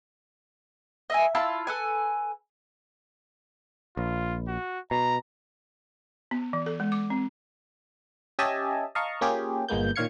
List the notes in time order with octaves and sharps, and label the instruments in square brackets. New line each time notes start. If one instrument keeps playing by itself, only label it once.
[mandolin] D#5 E5 G#5
E4 F4 A5 E6
A4 B4 G#5
[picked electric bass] A#1 [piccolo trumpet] F4
[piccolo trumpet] F#4
[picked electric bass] B2 [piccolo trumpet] A#5
[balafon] B3
E3
A4
G#3
D6
C4
[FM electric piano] C#4 G4 D#5 E5 G#5 A5
D#5 F5 A5 A#5 C#6
A#3 C#4 F4 G4 G#4
G1 A#2 G#3 A#3 B3 G6
A#2 D#3 C#5 F5 G#6 C#7